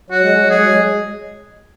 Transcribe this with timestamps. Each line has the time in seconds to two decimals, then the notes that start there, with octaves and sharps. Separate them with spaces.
0.11 F#3 F#4
0.22 G#3
0.34 F#3
0.45 G#3 G#4
0.57 F#3
0.69 G#3